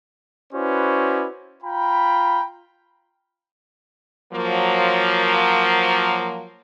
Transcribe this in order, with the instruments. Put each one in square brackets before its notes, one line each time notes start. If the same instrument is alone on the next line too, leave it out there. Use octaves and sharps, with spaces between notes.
[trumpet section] C#4 E4 F#4 B4 C5 D5
F4 G5 A#5 B5
[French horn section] F3 F#3 A#3